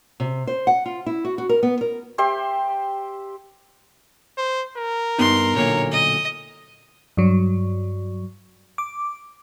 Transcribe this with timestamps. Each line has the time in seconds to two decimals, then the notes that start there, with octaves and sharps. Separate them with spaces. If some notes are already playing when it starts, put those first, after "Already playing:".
0.20 C3
0.47 C5
0.67 F#5
0.86 F4
1.06 E4
1.25 F#4
1.38 F#4
1.49 A#4
1.63 B3
1.81 A#4
2.18 G4 C5 E5 C6
4.37 C5
4.76 A#4
5.18 G2 B3 D#4 C6
5.55 B1 A#2 D3 C#5
5.91 D#5
7.17 G2 F#3
8.78 D6